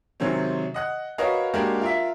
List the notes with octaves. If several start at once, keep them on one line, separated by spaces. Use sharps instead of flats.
G#2 C3 D#3 F#3 C4 C#4
D#5 F#5 F#6
F#4 A#4 B4 C#5 D#5 F5
G#3 A#3 D4 F#4 G4 A#4
F4 A#4 E5